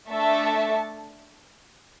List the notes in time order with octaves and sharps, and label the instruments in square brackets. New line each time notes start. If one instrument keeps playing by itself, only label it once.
[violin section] A3 D4 A4 E5 A5